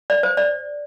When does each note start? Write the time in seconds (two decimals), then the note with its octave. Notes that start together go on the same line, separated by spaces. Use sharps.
0.10 D5
0.23 C5
0.37 D5